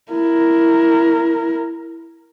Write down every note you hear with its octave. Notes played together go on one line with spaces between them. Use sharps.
E4 A#4